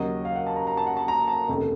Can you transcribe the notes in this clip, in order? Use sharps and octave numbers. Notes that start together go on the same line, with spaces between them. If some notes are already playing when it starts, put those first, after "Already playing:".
Already playing: D#2 C#3 F#3 D#5
F5
F#5
A5
A#5
A#5
A5
F#5
A5
A#5
A5
F1 D#2 C#3 A3